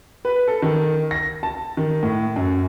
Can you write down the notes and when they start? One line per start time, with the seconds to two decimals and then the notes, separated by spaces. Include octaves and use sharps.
0.25 B4
0.48 A4
0.62 D#3
1.11 A#6
1.43 A5
1.77 D#3
2.03 A2
2.36 F#2